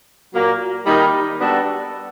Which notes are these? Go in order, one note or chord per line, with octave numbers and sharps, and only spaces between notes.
A#2 F#3 A#3
D#3 G3 A#3 D#4
G3 B3 D4 F#4 A4